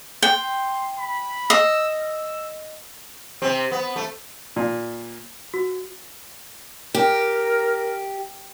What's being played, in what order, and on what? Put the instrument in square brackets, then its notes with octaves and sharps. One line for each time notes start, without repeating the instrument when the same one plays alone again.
[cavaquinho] G5 [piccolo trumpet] C6
[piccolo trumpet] B5
[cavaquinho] D#5 [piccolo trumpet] E6
[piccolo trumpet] E6
[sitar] C3 C4
B3
A3
[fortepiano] A#2
[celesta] F#4
[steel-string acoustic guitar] G4 [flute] A#4